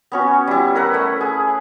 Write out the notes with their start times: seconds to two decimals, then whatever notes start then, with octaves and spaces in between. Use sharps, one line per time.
0.12 B3 C#4 F#4
0.47 G3 E4
0.75 A#4 B4 F#5
0.94 A3
1.21 G#4